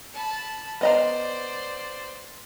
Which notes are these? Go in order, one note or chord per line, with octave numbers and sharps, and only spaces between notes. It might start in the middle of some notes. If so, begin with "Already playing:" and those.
A5 B5
B3 C5 D5 D#5 A#5